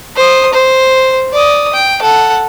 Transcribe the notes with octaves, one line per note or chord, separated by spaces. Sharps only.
C5 D#6
C5
D5 D#6
G5
A4 F#5